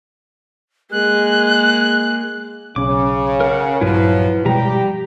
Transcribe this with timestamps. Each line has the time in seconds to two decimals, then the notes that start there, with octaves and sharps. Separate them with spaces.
0.92 G#3 A#3 F#6
2.76 B1 C#3 C#4 D6
3.40 A#4 F#5
3.81 A#1 G2 F3 F#3 E4 B4
4.45 B2 F3 G3 G#3 G4 A#5